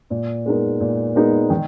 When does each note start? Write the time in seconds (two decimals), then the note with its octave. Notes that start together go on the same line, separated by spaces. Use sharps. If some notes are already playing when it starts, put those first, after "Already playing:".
0.10 A#2
0.46 G#3 B3 D#4 A#4
0.80 A#2
1.15 G#3 B3 D#4 A#4
1.50 D#3